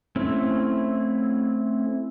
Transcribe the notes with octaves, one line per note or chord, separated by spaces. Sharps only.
A3 C4 C#4 E4